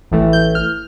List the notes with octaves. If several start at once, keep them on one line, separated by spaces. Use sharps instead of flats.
A1 A2 E3 A3
G6
F6